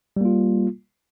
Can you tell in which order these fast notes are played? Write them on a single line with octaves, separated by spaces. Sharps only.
G3 A#3 F4